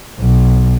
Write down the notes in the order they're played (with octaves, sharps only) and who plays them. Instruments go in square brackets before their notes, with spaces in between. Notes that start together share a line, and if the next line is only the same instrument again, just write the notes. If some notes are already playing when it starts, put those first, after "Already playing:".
[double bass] B1